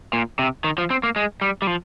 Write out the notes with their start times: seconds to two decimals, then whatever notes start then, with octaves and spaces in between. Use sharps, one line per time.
0.13 A#2
0.39 C3
0.64 D#3
0.78 F3
0.90 C4
1.03 A#3
1.16 G#3
1.41 G3
1.62 G3
1.67 F3